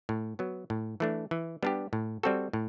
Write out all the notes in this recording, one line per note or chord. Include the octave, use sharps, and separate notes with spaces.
A2
F#3 B3
A2
E3 A3 D4
E3
G3 B3 D4 G4
A2
G3 C4 F#4 A4
A2